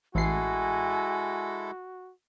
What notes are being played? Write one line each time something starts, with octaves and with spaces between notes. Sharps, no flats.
A1 G#3 E4 F#4 A4 G#5 C7